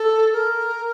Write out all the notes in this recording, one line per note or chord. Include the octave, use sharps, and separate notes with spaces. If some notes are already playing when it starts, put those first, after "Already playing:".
Already playing: A4
A#4